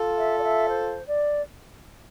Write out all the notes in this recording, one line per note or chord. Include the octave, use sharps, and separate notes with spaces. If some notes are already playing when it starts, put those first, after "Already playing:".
Already playing: F4 A4
E5
D5
E5
C5
D5